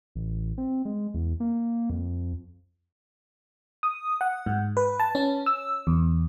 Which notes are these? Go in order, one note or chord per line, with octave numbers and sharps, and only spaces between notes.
A1
C4
G#3
E2
A#3
F2
D#6
F#5
G#2
B4
A5
C#4
E6
E2